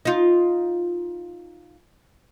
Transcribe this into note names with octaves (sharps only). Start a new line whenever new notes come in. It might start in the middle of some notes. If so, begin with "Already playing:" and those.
D#4 F4